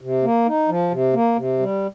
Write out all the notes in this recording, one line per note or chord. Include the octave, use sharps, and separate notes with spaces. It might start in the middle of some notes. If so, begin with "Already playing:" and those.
C3
A#3
D#4
F3
C3
A#3
C3
G3